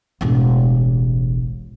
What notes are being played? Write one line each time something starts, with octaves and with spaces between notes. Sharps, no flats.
E1 A1